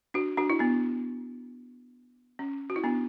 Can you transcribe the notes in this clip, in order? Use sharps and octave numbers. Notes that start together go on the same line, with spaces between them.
D4 F#4
D4 F#4
E4
B3 D4
C#4
F#4
E4
B3 D4